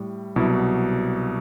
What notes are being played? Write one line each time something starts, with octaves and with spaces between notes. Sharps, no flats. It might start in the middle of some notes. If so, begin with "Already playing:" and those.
Already playing: A2 G3
C2 B2 F#3 E4